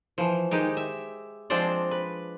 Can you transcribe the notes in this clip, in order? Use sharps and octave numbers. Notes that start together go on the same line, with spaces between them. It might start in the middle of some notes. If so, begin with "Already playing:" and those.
E3 F3
D#3 G#3 D#4 G4
E5
F3 G#3 C4 D4 C5 D5
B4